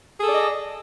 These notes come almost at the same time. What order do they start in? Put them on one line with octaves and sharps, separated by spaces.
G#4 A4 D5 D#5